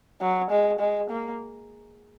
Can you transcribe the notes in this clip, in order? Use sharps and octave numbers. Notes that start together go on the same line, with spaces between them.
F#3
G#3
G#3
A#3